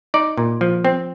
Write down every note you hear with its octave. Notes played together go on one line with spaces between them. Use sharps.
D#4 D5
A#2
F3
C4